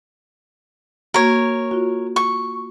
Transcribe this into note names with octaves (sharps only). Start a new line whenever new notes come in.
A#3 F#4 A#4 C#5
F4 F#4
C#6